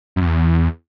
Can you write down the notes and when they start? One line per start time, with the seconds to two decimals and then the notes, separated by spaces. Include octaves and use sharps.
0.16 F#2
0.21 F2
0.26 E2